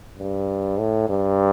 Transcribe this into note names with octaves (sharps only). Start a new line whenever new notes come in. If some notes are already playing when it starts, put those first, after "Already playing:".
G2
A2
G2